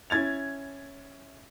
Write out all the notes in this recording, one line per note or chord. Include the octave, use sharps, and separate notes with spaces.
C#4 E4 G#6 A6 F7